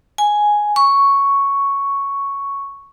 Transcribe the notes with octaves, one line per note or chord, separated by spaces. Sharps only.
G#5
C#6